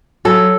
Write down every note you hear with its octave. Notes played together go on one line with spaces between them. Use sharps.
F#3 A4